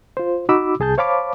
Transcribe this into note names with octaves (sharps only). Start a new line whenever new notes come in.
F4 C5
D#4 F#4 B5 D6 E6
C2 G#4 A5 G6
C5 C#5 F5 A5 B5 D6